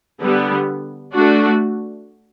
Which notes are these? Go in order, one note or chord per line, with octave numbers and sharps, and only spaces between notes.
D3 G3 B3
A3 D4 F#4